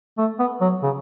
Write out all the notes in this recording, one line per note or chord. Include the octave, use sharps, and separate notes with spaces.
A3
B3
F#3
C#3